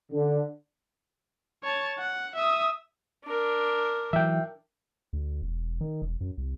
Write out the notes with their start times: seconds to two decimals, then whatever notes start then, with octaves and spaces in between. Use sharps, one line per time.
0.12 D3
1.64 C#5 A5
1.98 F#5
2.35 E5 D#6
3.25 D4 A#4
4.13 E3 F#3 E5 G5
5.13 D2
5.42 E1
5.81 D#3
6.02 E1
6.21 F#2
6.38 C2